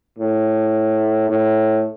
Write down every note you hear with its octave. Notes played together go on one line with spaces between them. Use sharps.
A2
A2